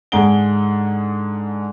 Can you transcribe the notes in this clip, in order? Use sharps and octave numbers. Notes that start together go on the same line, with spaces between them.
G#2 D3 G#4 F#5 D7 G7